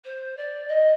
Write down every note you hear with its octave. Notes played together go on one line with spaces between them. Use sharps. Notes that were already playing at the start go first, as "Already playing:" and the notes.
C5
D5
D#5